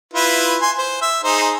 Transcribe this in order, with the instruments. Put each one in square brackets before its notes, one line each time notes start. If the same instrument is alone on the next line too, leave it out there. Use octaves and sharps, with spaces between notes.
[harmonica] E4 F4 B4
G#5 C6
C5
E5
D#4 G#4 C5